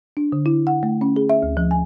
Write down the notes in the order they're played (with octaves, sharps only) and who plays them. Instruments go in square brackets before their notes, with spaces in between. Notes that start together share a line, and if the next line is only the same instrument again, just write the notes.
[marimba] D4
D3
E4
F#5
A3
C#4
G#4
E5
D2
F3
G#5